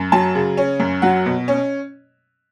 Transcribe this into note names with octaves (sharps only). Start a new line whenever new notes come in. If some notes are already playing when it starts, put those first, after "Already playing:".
Already playing: F#2
F#3 A5
C#3
C#4
F#2
F#3 F#5
B2
C#4